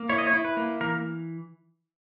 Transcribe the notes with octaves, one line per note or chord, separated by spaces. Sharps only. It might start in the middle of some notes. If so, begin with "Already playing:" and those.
Already playing: A#3
E4 C#5
D#5
C#5
E4
B4
A#3
E3 A#4